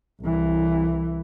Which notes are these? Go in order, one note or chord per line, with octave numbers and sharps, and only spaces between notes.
C2 E3